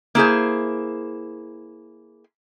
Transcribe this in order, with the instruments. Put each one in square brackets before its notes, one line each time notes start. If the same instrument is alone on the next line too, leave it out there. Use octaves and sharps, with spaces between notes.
[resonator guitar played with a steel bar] A#3 E4 G#4 C5